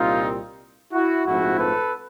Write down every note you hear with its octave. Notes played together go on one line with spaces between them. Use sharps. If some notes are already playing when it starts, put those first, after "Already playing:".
Already playing: C2 A#2 G3 C4 D#4 F4
E4 F#4
A#1 G#2 F3 A3 C4 E4 F#4
A4 B4